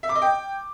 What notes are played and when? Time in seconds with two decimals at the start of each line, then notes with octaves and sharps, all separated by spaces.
0.03 E5
0.09 D6
0.15 D#5
0.22 G5